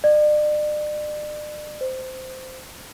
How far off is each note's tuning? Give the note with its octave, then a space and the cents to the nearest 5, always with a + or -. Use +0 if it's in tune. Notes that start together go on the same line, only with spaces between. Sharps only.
D5 +40
C5 -15